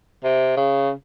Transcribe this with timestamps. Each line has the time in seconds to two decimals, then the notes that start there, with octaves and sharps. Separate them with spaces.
0.24 C3
0.57 C#3